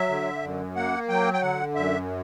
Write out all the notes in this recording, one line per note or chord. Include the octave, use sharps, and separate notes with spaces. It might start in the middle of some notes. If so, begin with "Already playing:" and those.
Already playing: F#3 E5
D3
F#2
A#3 F#5
F#3 G5
G5
D3 F#5
F#2 E5